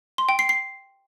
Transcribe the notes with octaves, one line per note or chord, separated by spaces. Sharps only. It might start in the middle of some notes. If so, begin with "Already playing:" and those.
C6
G5
C7
C7